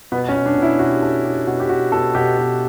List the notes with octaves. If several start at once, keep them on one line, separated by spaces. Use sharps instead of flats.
B2 B3
C#4
B2
D4
B2
E4
B2 F#4
G4
B2 A4
B2 G4
B2 F#4
G4
B2 F#4
B2 A4
B2 G4
B2